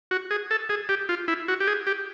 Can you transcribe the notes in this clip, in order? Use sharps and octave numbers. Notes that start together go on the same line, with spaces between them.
F#4
G#4
A4
G#4
G4
F4
E4
F#4
G4
G#4
G4